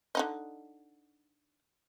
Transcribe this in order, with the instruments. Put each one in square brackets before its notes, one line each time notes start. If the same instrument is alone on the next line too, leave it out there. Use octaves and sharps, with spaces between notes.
[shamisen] D3 D#4 D#5